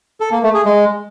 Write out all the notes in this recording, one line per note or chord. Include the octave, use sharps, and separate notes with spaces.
A4
A#3
A3
G#4
G#3